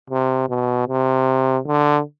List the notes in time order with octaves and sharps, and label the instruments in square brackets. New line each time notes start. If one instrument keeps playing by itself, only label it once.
[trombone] C3
B2
C3
D3